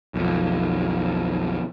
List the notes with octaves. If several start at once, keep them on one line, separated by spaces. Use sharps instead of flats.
B1 F2